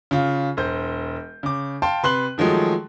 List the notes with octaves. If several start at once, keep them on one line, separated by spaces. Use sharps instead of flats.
C#3 F4
E1 C5 G6
C#3 D6
F5 G5 A5 C6
C3 B4 C6 F#6 F#7
D#3 F3 F#3 G#3 A3